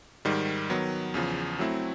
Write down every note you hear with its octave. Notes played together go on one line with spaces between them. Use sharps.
G#2 D#3 G3
D#3 F#3 B3
E2 C#3 F3
F#3 A3 C4 E4